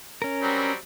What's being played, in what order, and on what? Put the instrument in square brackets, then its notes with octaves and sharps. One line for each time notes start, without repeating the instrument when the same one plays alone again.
[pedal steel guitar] C#4 A#4
[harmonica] F#3 G3 C4